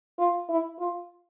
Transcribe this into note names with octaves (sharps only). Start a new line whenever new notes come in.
F4
E4
F4